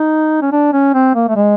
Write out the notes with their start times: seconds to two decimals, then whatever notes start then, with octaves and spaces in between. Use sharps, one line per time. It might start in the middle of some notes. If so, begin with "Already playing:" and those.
Already playing: D#4
0.42 C#4
0.52 D4
0.73 C#4
0.94 C4
1.15 A#3
1.29 A3
1.36 G#3